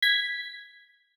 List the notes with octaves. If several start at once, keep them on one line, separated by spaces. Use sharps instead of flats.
G#6 B6